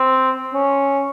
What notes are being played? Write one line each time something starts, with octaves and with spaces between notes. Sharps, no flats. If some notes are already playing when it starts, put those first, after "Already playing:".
Already playing: C4
C#4